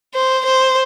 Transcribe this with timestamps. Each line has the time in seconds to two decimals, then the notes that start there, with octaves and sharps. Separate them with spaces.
0.14 C5
0.45 C5